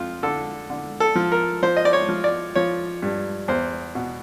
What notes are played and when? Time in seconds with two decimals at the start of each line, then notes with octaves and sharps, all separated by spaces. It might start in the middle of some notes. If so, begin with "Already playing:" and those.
Already playing: F2 F4
0.23 D3 A4
0.70 D3
1.00 A4
1.15 F3
1.32 A#4
1.62 F3 C5
1.77 D#5
1.85 D5
1.93 C#5
2.09 F3
2.24 D5
2.55 F3 C#5
3.02 G2
3.48 E2 C5
3.95 B2